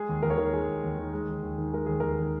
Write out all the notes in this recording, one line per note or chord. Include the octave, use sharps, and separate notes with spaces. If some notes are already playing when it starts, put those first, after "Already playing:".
Already playing: G#3 G#4
D#2
D#2 A#4
C#5
D#3 A#4
G#3 G#4
D#2
D#2
D#3
G#3
D#2
D#2
D#3
G#3 A#4
D#2 G#4
D#2 A#4
D#3